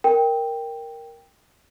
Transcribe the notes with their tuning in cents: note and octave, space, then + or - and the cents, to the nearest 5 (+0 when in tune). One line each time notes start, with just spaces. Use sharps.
A#4 +0 G5 +5